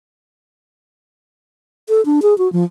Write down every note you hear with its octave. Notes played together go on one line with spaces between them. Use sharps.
A4
D4
G#4
F#4
F3